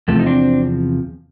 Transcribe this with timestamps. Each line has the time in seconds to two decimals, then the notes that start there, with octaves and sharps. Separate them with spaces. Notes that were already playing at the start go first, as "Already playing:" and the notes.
0.08 E2 C3 F3 A3
0.19 D#4
0.26 C4 D4